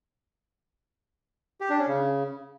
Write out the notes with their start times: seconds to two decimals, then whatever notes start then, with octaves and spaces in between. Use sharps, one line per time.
1.61 G4
1.70 D4
1.78 C#4
1.87 C#3